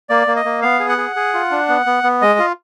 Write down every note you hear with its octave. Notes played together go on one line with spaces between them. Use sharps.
A#3 D5
A#3
D#5
A#3
B3 F5
G#4
F#5
G#4
G#4
F4
D4
B3
B3
B3
G#3 D#5
F4